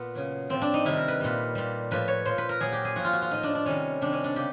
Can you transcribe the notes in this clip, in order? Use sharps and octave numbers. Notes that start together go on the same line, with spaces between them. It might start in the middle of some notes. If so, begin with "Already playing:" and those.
Already playing: A#2 B3
C#3 F#3
A2 F3 C4
D4
D#4
C3 D#3 G3 E4
A#4
B4
A#2 G3
A#2 G3
A2 F3 B4
C#5
A#2 F3 C5
B4
A#4
A#2 F#3 G#4
G4
G#4
A#2 F3 F#4
F4
F#4
F4
A2 F3 D#4
D4
D4
C3 D#3 G3 C#4
C3 D#3 G3 D4
C#4
D4
C#3 G4